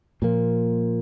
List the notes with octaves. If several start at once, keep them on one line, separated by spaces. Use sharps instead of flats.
A#2 F3 A#3